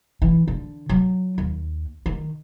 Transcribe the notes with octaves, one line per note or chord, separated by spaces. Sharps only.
E3
D3
F#3
D#2
D#3